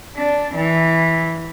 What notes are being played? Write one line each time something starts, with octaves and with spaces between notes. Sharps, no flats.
D4
E3